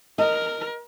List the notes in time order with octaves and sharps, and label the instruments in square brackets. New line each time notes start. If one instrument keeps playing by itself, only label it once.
[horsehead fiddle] A#4 [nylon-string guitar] D#5